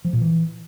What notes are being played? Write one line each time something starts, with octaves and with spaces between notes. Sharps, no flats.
F3
A#2
E3